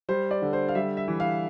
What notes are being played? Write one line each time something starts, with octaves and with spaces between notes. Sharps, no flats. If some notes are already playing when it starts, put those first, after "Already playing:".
G3 C5
D5
D3
C5
F5
G3 E5
E5
E3
F5